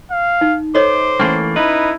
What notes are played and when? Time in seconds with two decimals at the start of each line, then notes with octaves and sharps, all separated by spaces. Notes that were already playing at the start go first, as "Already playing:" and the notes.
0.11 F5
0.41 D#4
0.75 A4 C5 C#5 D#5 D6
1.20 E3 A3 A#3 C#4
1.56 D#4 E4 B4